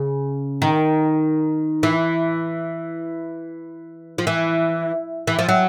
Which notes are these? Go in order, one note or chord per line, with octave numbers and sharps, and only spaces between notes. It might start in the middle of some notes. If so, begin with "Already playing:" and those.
Already playing: C#3
D#3
E3
F3
E3
E3
F3
F#3